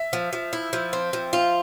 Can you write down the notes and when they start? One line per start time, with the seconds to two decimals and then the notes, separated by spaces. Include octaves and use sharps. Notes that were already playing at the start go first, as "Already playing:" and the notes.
Already playing: E5
0.13 F3
0.33 F3
0.53 E4
0.73 F3
0.93 C4
1.13 F3
1.33 F4